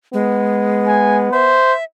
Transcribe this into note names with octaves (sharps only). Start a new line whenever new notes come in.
G#3 B3
G#5
C5 E5